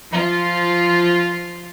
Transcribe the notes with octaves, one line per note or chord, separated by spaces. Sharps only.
F3 F4